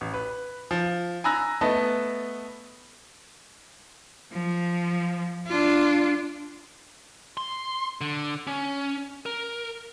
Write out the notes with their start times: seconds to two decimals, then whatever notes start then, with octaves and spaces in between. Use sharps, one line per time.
0.01 A1
0.14 B4
0.71 F3
1.24 G#5 A#5 B5 E6 F#6 A#6
1.61 A3 B3 B4 D#5 A5
4.32 F3
5.47 D4 F4
7.37 C6
8.01 D3
8.47 C#4
9.26 A#4